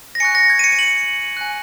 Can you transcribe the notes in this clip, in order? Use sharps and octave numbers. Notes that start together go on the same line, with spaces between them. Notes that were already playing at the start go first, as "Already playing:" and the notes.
A#6
G#5 C#6 F#6 C#7
A#6
G#6
D#7
C#7
D#7
F#7
G#5 F#6